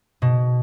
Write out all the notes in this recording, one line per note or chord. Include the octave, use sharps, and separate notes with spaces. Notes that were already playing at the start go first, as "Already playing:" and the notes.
B2